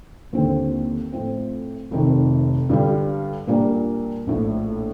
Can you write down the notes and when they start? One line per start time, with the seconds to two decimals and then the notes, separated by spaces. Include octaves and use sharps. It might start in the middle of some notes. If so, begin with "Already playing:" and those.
0.33 D#2 D3 F3 C4
1.12 A2 F3 C4
1.91 F1 F2 C3 D#3
2.69 G2 D3 G3
3.47 A#2 G3 A#3 D4 F4
4.27 A#1 A2 F3